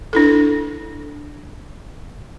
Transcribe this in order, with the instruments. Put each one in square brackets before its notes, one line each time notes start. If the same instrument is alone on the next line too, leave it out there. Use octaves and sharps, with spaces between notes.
[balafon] D4 E4 A4